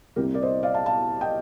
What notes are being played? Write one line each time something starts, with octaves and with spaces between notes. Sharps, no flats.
C2 C3 G3 A#3 G4 A#4
A#4 D5
C5 D#5
D5 F5
F5 A5
F5 A5
D#5 G5